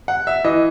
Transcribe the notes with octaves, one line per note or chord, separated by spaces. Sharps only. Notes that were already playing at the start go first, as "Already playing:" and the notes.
F#5
E5
E3 D#5